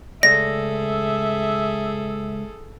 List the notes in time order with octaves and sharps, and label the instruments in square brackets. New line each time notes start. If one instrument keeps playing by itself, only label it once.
[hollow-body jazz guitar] C#2 A3 D5 [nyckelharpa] G#4 A4 [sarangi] E5 [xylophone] A#6